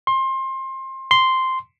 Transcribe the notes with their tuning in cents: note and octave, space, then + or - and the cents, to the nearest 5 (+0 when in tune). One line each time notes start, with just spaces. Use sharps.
C6 +25
C6 -5